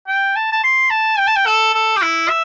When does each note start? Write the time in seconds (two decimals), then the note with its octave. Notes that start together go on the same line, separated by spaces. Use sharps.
0.07 G5
0.36 A5
0.52 A5
0.64 C6
0.90 A5
1.18 G5
1.27 A5
1.36 G5
1.46 A4
1.74 A4
1.97 G4
2.02 E4
2.29 E5